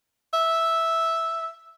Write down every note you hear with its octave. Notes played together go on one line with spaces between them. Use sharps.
E5